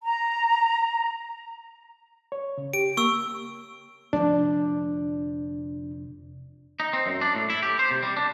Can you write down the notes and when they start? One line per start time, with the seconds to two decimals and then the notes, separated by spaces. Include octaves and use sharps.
0.02 A#5
2.32 C#5
2.58 C#3
2.73 G4 D7
2.97 A#3 C#6 E6
4.13 F1 D3 F3 D4
6.80 D#4
6.93 C4
7.06 F#2
7.21 D4
7.35 A2
7.50 E4
7.62 G4
7.79 C5
7.91 C3
8.03 G3
8.17 D4